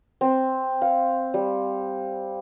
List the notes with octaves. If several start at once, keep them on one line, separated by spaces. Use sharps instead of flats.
C4
F5
G3